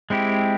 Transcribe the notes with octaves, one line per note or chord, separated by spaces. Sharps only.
G#3 C4 E4 G4